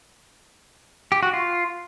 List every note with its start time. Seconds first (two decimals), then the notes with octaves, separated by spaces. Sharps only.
1.12 G4
1.23 F#4
1.33 F4